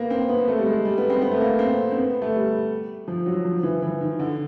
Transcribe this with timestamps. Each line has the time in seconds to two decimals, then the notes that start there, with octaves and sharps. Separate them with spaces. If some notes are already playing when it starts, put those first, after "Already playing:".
Already playing: A#3 B3
0.10 C4
0.29 B3
0.48 A3
0.57 G3
0.66 G#3
0.85 G3
0.98 B3
1.10 C4
1.22 B3
1.31 A3
1.41 A#3
1.59 C4
1.92 C4
1.97 B3
2.22 A3
2.34 G3
3.08 F3
3.26 F#3
3.45 F3
3.63 E3
3.82 E3
4.01 D#3
4.19 D3